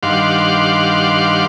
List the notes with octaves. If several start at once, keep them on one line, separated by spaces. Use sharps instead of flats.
G2 D#3 F5 F#5 C6 D6